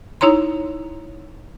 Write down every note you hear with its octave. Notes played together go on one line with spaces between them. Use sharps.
D#4 E4 C#5 A#5 C6